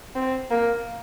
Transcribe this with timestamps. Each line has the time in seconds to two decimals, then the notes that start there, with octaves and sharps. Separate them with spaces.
0.15 C4
0.51 A#3